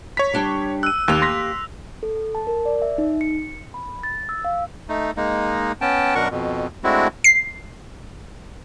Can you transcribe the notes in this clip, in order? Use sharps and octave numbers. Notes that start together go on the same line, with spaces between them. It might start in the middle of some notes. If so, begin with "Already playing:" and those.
C#5 A#5 B6
G3 D4 G4
E6 F#6 D#7
D#2 A#3 G4 F#6 F7
C6 A#6 B6
A4
A5
A#4
D5
E5
D#4
C#7
B5
A6
E6
F5
A3 D#4
G#3 A#3 D#4
B3 C#4 G5 A5
F#2 B2 D4 A#4 F#5 C#6
F2 B2
G#3 A3 C4 D4 E4 F#4
C7